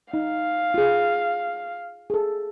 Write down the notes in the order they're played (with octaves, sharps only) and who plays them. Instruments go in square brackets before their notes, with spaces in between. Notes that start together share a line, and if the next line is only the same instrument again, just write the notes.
[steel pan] D#4 [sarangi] F5
[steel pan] F4 G#4
G#4 A4